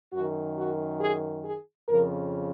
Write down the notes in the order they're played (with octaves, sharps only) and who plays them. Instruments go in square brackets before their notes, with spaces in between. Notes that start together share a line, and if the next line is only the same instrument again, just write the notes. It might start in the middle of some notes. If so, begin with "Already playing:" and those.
[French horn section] F#2 D#3 F#4
F#4
G#4
G#4
F2 C#3 F3 A#4